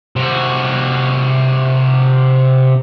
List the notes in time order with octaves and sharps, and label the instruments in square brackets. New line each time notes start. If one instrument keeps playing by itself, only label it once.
[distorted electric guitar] C3 F#4